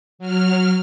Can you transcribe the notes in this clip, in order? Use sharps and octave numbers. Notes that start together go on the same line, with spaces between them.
F#3 F6